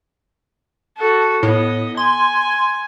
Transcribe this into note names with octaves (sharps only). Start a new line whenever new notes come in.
F#4 A4
A2 B3 D#5
G#5 C6